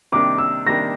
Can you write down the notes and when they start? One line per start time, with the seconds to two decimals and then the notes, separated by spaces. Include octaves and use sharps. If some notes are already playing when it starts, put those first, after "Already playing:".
0.12 C3 D#3 G3 A#3 D4 D6
0.38 E6
0.67 C3 D#3 G3 A#3 D4 A#6